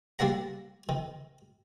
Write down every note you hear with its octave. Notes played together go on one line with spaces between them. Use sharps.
G3 A#3 D4 F#5 A#5
D#3